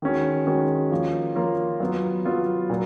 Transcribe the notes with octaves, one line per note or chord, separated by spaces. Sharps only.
D#3 G#3 C#4 F#4
D#3 G#3 C#4 F#4
F3 A#3 F4 A#4 C#5
F3 A#3 F4 A#4 C#5
F#3 B3 F4
F#3 B3 F4
A#2 F#3